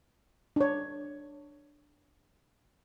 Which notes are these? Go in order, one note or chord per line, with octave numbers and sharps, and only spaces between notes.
D4 C#5